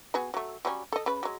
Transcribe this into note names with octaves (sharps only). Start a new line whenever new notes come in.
B3 F#4 G#4
F#3 A3
F#3 G3 C#4
A4 D#5
C#3 B4
F#3 G#3